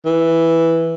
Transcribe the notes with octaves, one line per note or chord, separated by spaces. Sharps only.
E3